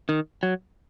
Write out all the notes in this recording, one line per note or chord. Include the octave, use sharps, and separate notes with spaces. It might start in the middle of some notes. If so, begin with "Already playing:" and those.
D#3
F#3